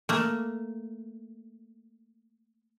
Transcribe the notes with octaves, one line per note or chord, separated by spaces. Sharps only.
A3 A#3